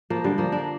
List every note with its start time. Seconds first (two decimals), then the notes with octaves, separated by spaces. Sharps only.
0.10 F3 A#3
0.24 D3 G3
0.38 F3 A#3
0.52 A#3 D4